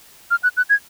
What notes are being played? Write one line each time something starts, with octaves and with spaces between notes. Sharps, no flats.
F6
F#6
F#6
G#6